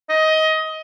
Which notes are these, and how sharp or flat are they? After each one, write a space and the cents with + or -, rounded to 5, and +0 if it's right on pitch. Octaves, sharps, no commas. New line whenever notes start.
D#5 +20